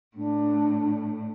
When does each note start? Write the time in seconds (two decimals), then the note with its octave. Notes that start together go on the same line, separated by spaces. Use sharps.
0.17 A2 D4